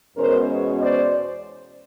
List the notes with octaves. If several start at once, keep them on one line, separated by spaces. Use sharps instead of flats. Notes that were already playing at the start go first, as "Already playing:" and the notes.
E2 B2 G#3 C#4 A#4 C5
C5 D5